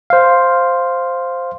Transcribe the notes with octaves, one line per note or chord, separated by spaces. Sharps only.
C5 F5